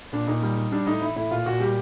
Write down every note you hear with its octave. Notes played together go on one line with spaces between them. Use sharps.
A#2 D4
A#2 D#4
G3
G3
G3 D4
A2 D#4
E3 E4
A2 E4
A#2 F4
A#2 F#4
G3 G4